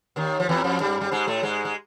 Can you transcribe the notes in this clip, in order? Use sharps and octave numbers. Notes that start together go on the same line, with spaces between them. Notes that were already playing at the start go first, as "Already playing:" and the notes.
D#2 D#3
F3
E2 E3
F2 F3
G2 G3
G3
G#2 G#3
A2 A3
G#2 G#3
G#3